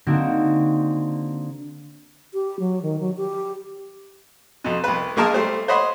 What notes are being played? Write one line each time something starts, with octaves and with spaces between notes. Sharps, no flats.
D3 A#3 C4 D#4 F#4
G4
F#3
D#3
F#3
G4
F2 B2
C2 B4
B1 G#3 A#3 A#4 A5 D#6
G3 A3 C5
C5 C#5 D#5 F#5 B5 C6